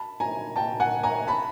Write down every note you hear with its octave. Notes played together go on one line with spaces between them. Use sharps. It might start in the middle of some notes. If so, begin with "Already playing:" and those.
Already playing: A5 B5
G#5 A#5
G5 A5
F#5 G#5
G#5 A#5
A5 B5